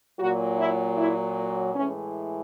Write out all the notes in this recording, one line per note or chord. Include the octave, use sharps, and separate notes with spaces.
A#2 F#3 F#4
E4
E4
A2 E3 G#3 C#4